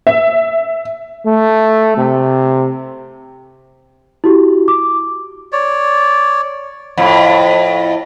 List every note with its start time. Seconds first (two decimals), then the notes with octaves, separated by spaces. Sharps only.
0.07 E5
1.26 A3
1.97 C3
4.24 E4 F#4 G4
4.68 D6
5.52 C#5 D5
6.97 F2 A2